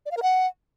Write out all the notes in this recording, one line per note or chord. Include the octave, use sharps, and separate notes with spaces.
D5
F5
A#4
F#5